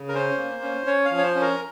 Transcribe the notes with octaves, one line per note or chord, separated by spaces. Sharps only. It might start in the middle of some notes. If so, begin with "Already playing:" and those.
Already playing: C#3
A#4
C#4 C5
A#3
C#4
C#4 C#5
F5
F3
C#5
C5
C#4
A#4